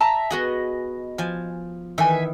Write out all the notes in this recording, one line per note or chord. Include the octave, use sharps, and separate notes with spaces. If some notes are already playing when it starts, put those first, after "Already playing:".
E5 A5 A#5
B3 F#4 G#4 D#5
F3 G#5 A5
D#3 E3 E5 G#5